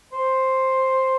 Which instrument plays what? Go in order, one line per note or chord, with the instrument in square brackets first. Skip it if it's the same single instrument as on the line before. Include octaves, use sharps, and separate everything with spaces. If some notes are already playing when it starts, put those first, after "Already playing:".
[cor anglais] C5